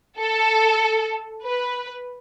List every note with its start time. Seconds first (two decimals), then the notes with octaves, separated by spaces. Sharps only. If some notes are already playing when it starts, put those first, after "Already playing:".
0.19 A4
1.44 B4